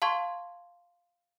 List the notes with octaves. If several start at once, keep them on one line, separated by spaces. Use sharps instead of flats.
F5 A5 C6 C#6 G#6